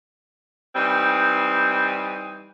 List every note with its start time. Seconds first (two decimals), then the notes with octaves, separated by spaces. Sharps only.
0.76 E3 G3 C4 D#4